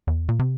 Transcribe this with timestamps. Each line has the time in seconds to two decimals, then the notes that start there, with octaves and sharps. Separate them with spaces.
0.07 E2
0.29 A#2
0.39 C3